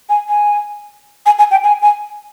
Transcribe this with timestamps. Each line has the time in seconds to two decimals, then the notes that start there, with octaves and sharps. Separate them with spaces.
0.09 G#5
0.29 G#5
1.26 G#5
1.39 G#5
1.51 G5
1.64 G#5
1.82 G#5